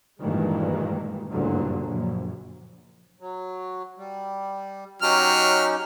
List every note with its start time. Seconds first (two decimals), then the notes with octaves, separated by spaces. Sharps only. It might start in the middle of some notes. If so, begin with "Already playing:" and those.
0.21 D2 G2 A#2 D#3 E3 G#3
1.31 F#1 D2 G2 A#2 D3 F#3
1.85 A#1 F#2
3.20 F#3
3.98 G3
5.02 F#3 C#4 D#4 G4 F6